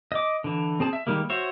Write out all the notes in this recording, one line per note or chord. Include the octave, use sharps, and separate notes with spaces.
D#5 D6
D3 E3
C4 G#4 A5
E5
D#3 G3 G#3 A#3
F#4 C5 C#5 E5